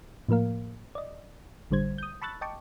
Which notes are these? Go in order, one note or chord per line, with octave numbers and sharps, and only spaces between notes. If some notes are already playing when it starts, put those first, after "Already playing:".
A2 F3 A#3 A#4 F5
D5 D#5
A1 D3 G3 C5 G#6
D#6 G6
A5 B5 C#6 E6 F#6 A6
D#5 G5 A5 C#6 D6